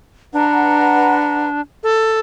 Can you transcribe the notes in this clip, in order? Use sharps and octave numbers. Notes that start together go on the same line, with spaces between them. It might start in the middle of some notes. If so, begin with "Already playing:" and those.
D4 B4 F#5 A#5
A4